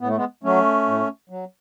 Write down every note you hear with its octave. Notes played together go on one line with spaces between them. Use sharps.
A2 B3
A3
G#3 B3
F#3 A3 C#4
A2
F#3